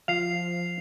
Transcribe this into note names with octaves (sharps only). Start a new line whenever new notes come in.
F3 F5 C7 F7